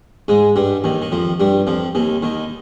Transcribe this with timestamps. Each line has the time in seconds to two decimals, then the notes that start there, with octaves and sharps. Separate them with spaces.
0.28 G#2 G#3
0.56 G2 G3
0.84 D#2 D#3
1.02 D#3
1.12 F2 F3
1.40 G2 G3
1.67 F2 F3
1.95 D#2 D#3
2.22 D#2 D#3